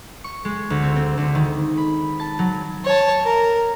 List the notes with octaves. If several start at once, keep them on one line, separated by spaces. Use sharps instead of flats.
C#6
G#3
D2
C4
C4
D2
D#3
B5
A5
F#3
C#5 A5
A#4